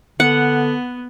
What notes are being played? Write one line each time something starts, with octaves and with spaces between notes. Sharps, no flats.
D3 B3 F#5